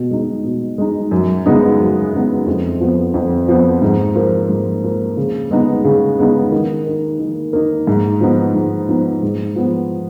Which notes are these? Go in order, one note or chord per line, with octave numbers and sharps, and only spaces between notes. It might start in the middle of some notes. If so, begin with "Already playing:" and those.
Already playing: B2
G#3 D#4
B2
G#3 D#4
F#2
C#3 G#3 B3 D#4
F#2
C#3 G#3 B3 D#4
F2
F3 B3
F2
F3 B3
G#2
F3 A#3
G#2
F3 A#3
C#3
G#3 B3 D#4
C#3
G#3 B3 D#4
D#3
A#3 D#4
D#3
A#3 D#4
G#2
F3 B3 D#4
G#2
F3 B3 D#4
G#2
F3 B3 F4